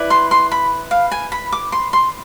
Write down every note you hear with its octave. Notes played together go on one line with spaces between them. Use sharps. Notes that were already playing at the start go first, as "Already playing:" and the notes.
Already playing: E4 B4 D5
C6
C6
B5
F5
G#5
B5
D6
C6
C6